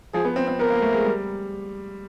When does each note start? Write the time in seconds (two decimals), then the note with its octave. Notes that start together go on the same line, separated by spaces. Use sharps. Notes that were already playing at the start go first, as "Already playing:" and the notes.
0.13 F3 G#4
0.25 B3
0.36 C4
0.48 C4
0.59 B3 A#4
0.70 A#3
0.82 A3
0.93 G#3
1.05 G3